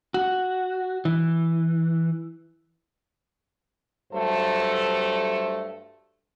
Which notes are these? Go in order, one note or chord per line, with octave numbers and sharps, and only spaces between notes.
F#4
E3
G2 F#3 A3 A4 C5